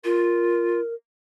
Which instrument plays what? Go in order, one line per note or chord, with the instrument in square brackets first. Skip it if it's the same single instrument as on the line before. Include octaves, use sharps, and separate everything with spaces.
[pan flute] F4 [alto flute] A#4